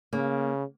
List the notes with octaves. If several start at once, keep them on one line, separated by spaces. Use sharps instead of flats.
C#3 A#3